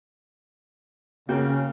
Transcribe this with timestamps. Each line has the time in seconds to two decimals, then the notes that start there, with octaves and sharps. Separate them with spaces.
1.29 C#3 A#3 F#4 G5